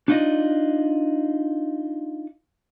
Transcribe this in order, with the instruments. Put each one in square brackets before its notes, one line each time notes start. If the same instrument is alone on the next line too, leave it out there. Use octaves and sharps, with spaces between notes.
[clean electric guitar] D4 D#4 F4 D5 D#5